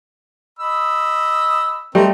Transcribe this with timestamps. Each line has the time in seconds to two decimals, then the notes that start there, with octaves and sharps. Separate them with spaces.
0.59 D#5 B5 E6
1.95 G3 A3 C4 A#4 D#5